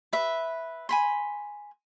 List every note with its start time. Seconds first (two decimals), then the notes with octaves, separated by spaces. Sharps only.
0.13 B4 E5
0.89 G#5 B5 C6